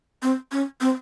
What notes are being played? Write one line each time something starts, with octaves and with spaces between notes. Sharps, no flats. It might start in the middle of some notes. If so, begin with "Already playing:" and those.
C4
C#4
C4